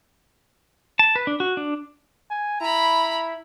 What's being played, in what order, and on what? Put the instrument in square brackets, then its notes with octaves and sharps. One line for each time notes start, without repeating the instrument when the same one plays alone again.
[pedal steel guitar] A5
B4
D4
F#4
D4
[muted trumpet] G#5
[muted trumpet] E4 [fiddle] A#5 B5